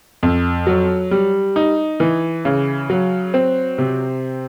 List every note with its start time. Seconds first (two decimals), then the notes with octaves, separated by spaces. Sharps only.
0.23 F2
0.67 F#3
1.11 G3
1.56 D#4
2.00 E3
2.45 C#3
2.90 F#3
3.34 C4
3.78 C3